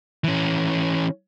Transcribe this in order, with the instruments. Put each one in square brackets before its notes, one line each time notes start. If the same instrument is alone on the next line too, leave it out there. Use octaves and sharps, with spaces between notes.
[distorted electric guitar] E3 C#4